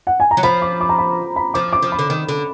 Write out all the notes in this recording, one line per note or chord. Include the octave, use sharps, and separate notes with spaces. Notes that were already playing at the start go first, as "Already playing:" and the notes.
F#5
G#5
A#5
F#3
F3 B5
D6
D6
A#5
B5
B5
F3 D6
D6
F3
B5
D3
D#3
D3